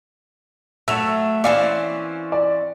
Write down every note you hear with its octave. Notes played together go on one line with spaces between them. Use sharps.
F#3 A3 E6 E7 F7
E3 C4 C#4 D5 F5
D5